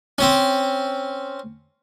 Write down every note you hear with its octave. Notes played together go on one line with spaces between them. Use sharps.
C4 C#4